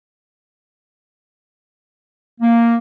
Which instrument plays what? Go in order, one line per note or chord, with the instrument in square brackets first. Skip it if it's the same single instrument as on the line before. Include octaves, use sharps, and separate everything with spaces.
[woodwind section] A#3